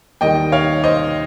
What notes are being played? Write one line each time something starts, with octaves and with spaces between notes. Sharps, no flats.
D#2 D#3 G3 D#5 G5
C#5 F5
C5 D#5